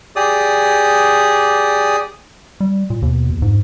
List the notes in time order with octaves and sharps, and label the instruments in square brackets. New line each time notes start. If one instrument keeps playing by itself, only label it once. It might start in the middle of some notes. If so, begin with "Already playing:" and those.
[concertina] G4 G#4 D5 D#6
[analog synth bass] G3
A#2
[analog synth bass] D#2 [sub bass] B2
[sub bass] E2
[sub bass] F2 [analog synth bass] G#2